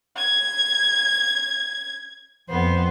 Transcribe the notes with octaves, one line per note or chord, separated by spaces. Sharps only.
G#6
F2 B3 C5